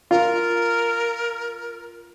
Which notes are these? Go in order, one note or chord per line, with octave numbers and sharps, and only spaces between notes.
F4 A#4